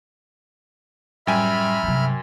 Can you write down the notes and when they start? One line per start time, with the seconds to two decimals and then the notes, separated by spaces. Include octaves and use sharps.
1.27 F#2 A2 G3 E5 G5 G#5 B5 F6
1.83 G2 C3 F#3